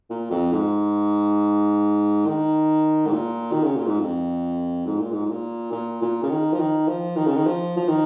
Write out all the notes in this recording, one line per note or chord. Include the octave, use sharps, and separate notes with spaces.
A#2
F2
G#2
D#3
G#2
A#2
D#3
C#3
A#2
G#2
F2
G#2
A#2
G#2
G#2
A#2
A#2
A#2
C#3
D#3
F3
D#3
F3
D#3
C#3
D#3
F3
F3
D#3